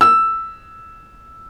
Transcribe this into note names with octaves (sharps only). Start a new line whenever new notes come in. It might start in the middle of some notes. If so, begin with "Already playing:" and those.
E6